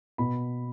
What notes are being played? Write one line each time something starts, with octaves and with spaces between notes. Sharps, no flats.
B2 B5